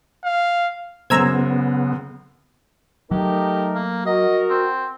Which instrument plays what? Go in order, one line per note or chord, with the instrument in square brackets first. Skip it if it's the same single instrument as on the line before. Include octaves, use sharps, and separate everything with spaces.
[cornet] F5
[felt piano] F#2 C5 [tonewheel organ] C#3 B3 [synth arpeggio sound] A#5 E6 G#6
[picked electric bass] F#3 [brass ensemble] A3 D#4 A#4 [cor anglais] G4
[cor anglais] A#3
[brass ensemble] F#4 A#4 [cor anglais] D#5
[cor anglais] C4